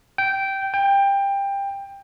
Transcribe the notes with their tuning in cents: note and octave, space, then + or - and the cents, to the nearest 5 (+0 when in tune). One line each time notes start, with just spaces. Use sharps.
G5 -10
G5 +20